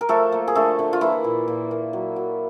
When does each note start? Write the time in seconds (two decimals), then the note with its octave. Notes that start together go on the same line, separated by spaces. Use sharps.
0.01 A#4
0.09 F3 A3 A4
0.32 A#3
0.48 G#4
0.55 D3 A3 A4
0.79 D3
0.93 F4
1.01 E3 A#3 E4
1.24 A#2
1.48 A#2
1.71 A#3
1.93 F#3
2.16 F#3